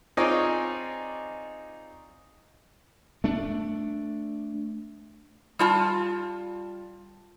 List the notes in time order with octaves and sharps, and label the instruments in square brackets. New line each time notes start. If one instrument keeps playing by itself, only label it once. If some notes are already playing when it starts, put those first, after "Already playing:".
[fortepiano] C4 D#4 F4 G#4 C#5 D5
[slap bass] A3 D4
[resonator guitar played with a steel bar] G3 F4 A5